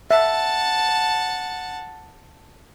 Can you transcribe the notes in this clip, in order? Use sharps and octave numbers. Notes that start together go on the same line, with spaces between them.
E5 F#5 A5